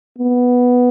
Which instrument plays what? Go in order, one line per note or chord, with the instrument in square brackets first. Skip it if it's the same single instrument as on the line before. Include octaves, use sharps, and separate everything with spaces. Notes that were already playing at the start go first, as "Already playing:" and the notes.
[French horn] B3